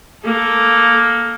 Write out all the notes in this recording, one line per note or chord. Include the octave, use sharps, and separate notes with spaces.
A#3 A4